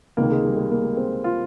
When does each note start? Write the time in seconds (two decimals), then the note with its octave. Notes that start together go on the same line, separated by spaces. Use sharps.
0.17 C#2 C3 D#3 A#3
0.32 G#3
0.45 G3
0.57 G#3
0.71 A#3
0.84 G#3
0.97 C4
1.24 F4